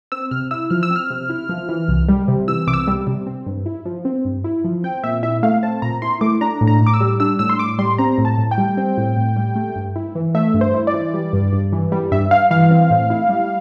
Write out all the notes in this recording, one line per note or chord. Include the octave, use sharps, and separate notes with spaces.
C4 E6
C3 F6
E4 E6
F3 F6
E6
C4
F6
C3
E4
F3
E3
C2
G3
C3
E3 E6
C2 D6
E6
G3
C3
C4
G2
E4
F3
C4
G2
E4
F3
C4 G5
A#2 E5
E4 E5
A3 F5
C4 A5
A#2 A#5
E4 C6
A3 D6
D4 A#5
A2
A#5
A2
D6
E6
G3
D4 E6
A2 E6
C6
A2 D6
G3 C6
C4 A#5
A2
A5
A2
G5
G3
C4
A2
A2
G3
A3
G2
E4
E3
A3 E5
G2
C5
E4
D5
E3
G3
G2
G2
E3
G3
G2 E5
G2 F5
E3 F5
C4
A2
E4
G3